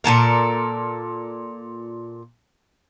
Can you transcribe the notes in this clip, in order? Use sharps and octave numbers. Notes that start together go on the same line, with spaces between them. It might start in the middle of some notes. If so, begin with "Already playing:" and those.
A#2 F#3 A4 A#4